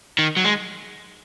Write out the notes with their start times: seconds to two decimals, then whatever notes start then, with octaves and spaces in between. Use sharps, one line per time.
0.19 D#3
0.37 F#3
0.44 G#3